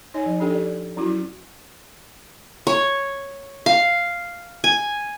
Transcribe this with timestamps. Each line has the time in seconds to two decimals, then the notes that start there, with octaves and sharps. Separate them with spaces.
0.14 D#4 C#5 D#5 G#5
0.26 F3
0.40 D4 G4 A4 G5
0.54 D5
0.97 F#3 C#4 E4 F#4
2.67 C#5
3.66 F5
4.64 G#5